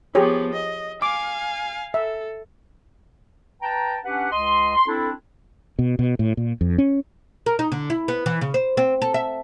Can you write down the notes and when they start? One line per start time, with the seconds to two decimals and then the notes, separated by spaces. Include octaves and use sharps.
0.15 F3 B3 G4 G#4 C#5
0.54 D#5
1.02 F5 G#5 D6
1.94 A4 E5
3.61 B4 G5 A5 A#5
4.04 C#4 D4 G4 B4 F#5
4.32 C#2 D#5 C6
4.75 C6
4.88 C4 D4 E4 A4
5.79 B2
5.99 B2
6.19 A2
6.37 A#2
6.61 F2
6.78 C#4
7.46 A#4
7.59 D#4
7.72 D3
7.90 E4
8.08 B3
8.26 E3
8.41 C#3
8.54 C5
8.77 C4
9.02 A4
9.14 E5